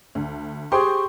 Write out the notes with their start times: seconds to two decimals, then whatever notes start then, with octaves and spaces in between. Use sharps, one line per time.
0.15 D2
0.72 G4 G#4 C5 G5 C6 C#6